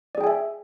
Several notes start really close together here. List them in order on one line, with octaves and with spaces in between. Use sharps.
D5 G#4 G5 G#5 E5